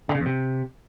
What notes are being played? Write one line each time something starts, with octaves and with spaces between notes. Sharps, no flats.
D3
C#3
E2
C3